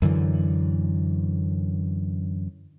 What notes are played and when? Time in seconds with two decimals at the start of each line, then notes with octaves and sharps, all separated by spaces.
0.02 F#2 D3 E3